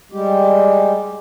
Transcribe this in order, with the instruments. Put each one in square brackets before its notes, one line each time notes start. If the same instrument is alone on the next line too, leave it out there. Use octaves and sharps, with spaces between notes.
[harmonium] G3 G#3 G4